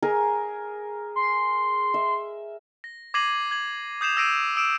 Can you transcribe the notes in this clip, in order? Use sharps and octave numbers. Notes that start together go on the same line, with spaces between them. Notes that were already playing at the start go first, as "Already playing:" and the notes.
G#4 A#4 G#5
C6
E5
A#6
D6 G#6 A#6 C7 D#7 F#7
G#6 F#7
D#6 G6 C7 E7 F7
E6 G6 A#6 C7 D7 D#7
D#6 E6 D7 E7